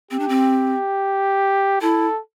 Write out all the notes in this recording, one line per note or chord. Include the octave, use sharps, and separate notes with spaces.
C4 G4
D4
C4
E4 A4